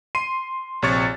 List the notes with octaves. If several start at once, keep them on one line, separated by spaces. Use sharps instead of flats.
C6 C7 D#7
A#1 C3 C#5 C#6 A6